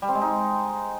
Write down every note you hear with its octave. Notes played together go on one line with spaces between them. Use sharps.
G3
C4
G#3
D#4